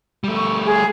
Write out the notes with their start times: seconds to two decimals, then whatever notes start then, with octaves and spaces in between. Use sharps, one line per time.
0.24 G3 A3
0.36 C#6
0.65 G#4